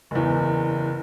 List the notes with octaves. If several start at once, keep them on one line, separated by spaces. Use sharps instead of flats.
F#1 E2